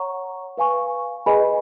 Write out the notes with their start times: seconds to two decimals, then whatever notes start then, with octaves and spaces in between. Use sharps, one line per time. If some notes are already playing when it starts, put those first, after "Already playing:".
Already playing: C#5 F#5 A#5 C#6
0.58 B4 F5 G#5 C#6
1.26 G#4 B4 D#5 G#5 B5